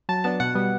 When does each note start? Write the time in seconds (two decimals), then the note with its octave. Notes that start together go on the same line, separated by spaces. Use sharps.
0.09 F#3 A5
0.24 B3 D4 A5
0.40 B2 F#5
0.55 G3 B3